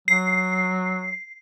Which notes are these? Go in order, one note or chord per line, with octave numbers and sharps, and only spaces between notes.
F#3 C7